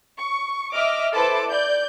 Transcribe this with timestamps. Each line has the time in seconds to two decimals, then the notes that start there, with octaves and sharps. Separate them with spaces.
0.16 C#6
0.73 D#5 E5 D6 F6
1.14 E4 A4 B4 C5 A5 D6
1.47 D5 G6